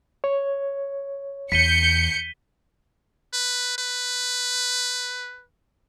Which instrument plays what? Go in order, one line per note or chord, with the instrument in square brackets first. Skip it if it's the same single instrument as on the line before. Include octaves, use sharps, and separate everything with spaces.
[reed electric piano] C#5
[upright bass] E2 [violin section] G6 C#7 [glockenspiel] B6 D#7 G7
[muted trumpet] B4
B4